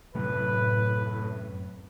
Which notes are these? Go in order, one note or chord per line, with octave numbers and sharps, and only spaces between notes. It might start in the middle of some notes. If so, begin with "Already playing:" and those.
F#2 A2 C3 F#3 B4